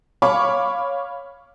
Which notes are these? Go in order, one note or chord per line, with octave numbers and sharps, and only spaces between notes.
C#5 F5 B5 C#6 D6